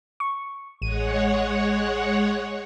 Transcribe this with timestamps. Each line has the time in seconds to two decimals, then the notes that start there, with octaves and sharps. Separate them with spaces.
0.20 C#6
0.82 A1 G#3 C#5 F#5 D#7